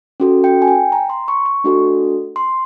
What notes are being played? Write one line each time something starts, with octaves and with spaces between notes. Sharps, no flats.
C#4 F#4 A4
G5
G#5
G5
A#5
C6
C#6
C#6
A3 D4 F#4 A4
C6